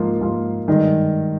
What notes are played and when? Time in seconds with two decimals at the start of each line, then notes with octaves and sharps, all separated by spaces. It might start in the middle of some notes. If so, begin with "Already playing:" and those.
Already playing: G#2 F3 A#3 F4
0.19 G#2 F3 A#3 F4
0.68 G2 D#3 G#3 D#4